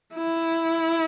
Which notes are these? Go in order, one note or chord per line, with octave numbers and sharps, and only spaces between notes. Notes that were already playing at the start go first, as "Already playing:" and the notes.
E4